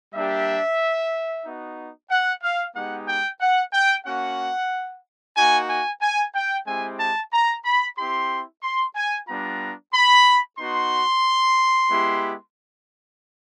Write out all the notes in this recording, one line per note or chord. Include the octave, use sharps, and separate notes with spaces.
G3 A#3 D4 G4 E5
B3 D#4 F#4
F#5
F5
G#3 B3 D#4 G4 F#5
G5
F#5
G5
A#3 C#4 F#4 F#5
A#3 D#4 F#4 G#5
G#5
G#5
G5
G#3 C4 E4 G4 G#5
A5
A#5
B5
C4 E4 G4 C6
C6
G#5
G3 B3 D4 F4 A#5
B5
B3 D#4 F#4 C6
G#3 B3 E4 G4